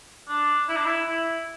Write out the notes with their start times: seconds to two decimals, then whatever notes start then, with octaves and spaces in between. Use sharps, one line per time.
0.29 D4
0.69 E4
0.76 D4
0.85 E4
1.09 E4